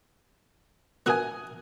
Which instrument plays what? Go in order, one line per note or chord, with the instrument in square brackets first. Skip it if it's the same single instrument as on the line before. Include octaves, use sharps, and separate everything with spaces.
[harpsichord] B3 F#4 A#4 [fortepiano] G#5 D#6 F#6